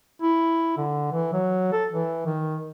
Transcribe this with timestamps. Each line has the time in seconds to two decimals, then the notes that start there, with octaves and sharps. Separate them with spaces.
0.22 E4
0.77 D3
1.12 E3
1.33 F#3
1.72 A4
1.92 E3
2.26 D#3